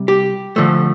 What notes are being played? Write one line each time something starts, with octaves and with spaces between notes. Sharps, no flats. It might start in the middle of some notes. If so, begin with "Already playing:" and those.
Already playing: C3 G3
G4
D3 F3 A3